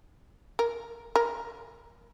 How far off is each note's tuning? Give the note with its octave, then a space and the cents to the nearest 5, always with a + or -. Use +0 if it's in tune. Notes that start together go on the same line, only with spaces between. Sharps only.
A#4 +5
A#4 +10